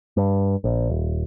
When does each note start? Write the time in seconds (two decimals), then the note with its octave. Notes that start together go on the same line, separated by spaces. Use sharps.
0.17 G2
0.64 A#1
0.90 D#1